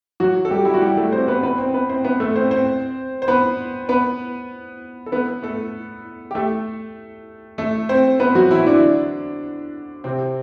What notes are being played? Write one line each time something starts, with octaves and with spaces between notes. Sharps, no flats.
F#3 F#4
A4
G3 G4
E4
F#4
G3 G4
A3 A4
C4 C5
B3 B4
B3 B4
C4 C5
B3 B4
C4 C5
B3 B4
A3 A4
C4 C5
C4 C5
C5
B3 B4
B3 B4
A4
B3 B4
A3 A4
G4
A3 A4
A3 A4
C4 C5
B3 B4
F#3 F#4
E3 E4
D3 D4
C3 C4